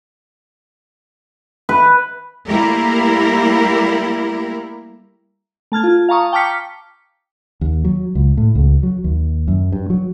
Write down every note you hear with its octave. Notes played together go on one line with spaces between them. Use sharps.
B4
G3 A3 A#3 E4 G4 A#4
A3 A5 F6 G#6
F4
F5 A5 A#5 C#6 D#6
G5 A5 D6 F6 B6 C#7
D#2
F#3
C#2
A2
C#2
F#3
D#2
F#2
G2
F#3